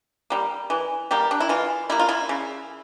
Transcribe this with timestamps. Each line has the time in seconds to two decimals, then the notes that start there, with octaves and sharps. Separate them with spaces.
0.30 G3 A#3
0.70 E3
1.11 G3 A#3 G4
1.31 D4
1.40 E4
1.49 E3 F4
1.89 G3 A#3 E4
1.99 F4
2.09 E4
2.29 C#3